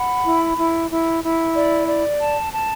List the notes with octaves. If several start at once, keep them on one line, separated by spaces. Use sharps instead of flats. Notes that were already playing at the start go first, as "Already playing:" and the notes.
Already playing: F#5 B5
E4
E4
E4
E4
D5
D5
A5
A5